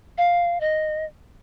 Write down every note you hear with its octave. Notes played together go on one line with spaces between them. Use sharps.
F5
D#5